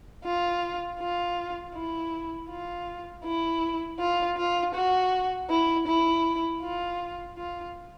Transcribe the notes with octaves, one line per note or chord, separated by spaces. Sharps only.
F4
F4
E4
F4
E4
F4
F4
F#4
E4
E4
F4
F4